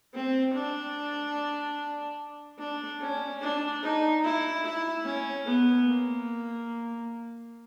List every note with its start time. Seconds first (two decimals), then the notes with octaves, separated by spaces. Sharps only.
0.14 C4
0.54 D4
2.59 D4
3.01 C#4
3.42 D4
3.83 D#4
4.24 E4
4.64 E4
5.05 C#4
5.46 B3
5.87 A#3